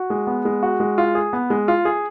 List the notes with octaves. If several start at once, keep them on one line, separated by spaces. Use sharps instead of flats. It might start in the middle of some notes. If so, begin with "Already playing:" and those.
Already playing: F#4
G#3
B3
G#3
F#4
G#3
F4
G#4
B3
G#3
F4
G#4